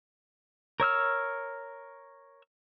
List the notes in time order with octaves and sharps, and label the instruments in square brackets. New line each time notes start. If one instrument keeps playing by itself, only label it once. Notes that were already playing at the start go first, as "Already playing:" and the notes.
[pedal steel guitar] A#4 C#5 E6 F6